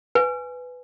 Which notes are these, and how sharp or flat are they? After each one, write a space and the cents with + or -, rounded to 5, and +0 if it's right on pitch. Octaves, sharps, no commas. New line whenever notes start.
B4 +10 G#5 +0